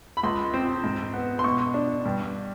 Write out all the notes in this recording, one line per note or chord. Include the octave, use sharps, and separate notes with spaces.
B5
C#2 C6
C4
G#2
B3
C6
B2 C#6
D4
G2